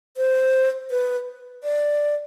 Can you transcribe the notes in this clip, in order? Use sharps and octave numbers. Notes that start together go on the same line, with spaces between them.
C5
B4
D5